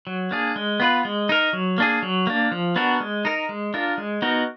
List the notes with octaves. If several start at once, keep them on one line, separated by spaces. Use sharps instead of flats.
F#3
A#3 D4 G#4
G#3
B3 F4 B4
G#3
D#4 A#4
F#3
A#3 D4 G#4
F#3
A#3 D4
F3
B3 D4 F#4 A#4
G#3
D#4 A#4
G#3
D4 F4 A#4
G#3
B3 D#4 F#4 A#4